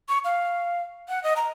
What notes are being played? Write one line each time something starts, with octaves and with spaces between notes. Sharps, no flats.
C#6
F5
F#5
D#5
A#5